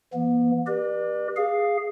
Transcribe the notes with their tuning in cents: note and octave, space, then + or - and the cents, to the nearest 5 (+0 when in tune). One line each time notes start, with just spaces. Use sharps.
E3 +30 B3 -40
G4 +0 B4 -40 D5 +35
G#4 -10 F5 +0